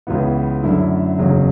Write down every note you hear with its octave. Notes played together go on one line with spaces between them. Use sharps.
C#2 C#3 E3 B3
F#2 D3 A3 E4
F#1 E2 C#3 F#3